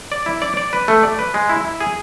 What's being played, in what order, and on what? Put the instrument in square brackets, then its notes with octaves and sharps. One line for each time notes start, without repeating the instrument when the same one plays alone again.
[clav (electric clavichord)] D5
E4
D5
D5
B4
A3
D5
B4
G#3
E4
E4
G#4